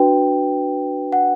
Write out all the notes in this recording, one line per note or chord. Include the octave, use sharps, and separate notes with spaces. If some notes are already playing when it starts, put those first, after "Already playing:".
Already playing: D4 F#4 B4 G5
F#5